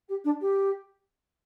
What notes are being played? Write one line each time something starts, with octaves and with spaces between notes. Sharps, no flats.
G4
D4
G4